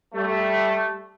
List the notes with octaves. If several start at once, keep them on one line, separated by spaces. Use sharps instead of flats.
G3 A3